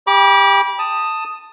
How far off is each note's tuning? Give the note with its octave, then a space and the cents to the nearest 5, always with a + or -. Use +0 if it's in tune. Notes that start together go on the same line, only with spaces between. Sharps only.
G4 +25 B5 -35 D6 -15
A5 +10 D#6 -5